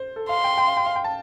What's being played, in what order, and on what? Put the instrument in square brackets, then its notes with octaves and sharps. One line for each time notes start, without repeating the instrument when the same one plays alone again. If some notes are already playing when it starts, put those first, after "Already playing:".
Already playing: [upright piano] C5
A4
[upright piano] F5 [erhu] C6
[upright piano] G5
G5
F5
G5
F5
G5
A5